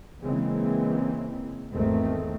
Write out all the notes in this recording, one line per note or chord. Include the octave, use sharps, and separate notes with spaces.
C#3 E3 G#3 A#3 C4
G#1 E2 D#3 A3 C4